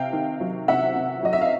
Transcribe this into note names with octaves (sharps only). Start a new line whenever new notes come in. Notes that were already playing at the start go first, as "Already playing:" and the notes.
Already playing: C3 F5 G5
D#3
F#3
C3 E5 F#5
C3
F#3 D#5
E5
F5